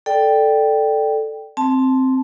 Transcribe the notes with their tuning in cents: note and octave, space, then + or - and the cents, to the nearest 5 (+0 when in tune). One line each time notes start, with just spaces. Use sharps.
A4 +0 D5 +15 G5 +0
C4 +0 A5 -10